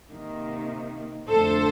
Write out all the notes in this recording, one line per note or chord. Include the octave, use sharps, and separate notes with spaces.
C3 D#3 A#3
F2 D3 A3 A4 C5